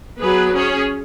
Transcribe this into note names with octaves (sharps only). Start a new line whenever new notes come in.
F#3 B3 G#4 B4
C#4 G#4 C#5